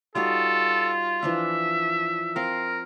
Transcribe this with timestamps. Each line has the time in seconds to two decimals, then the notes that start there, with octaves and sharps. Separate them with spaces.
0.15 G3 D#4 F4 F#4 A4
1.23 E3 F3 D4 E5
2.36 C4 A#4 F5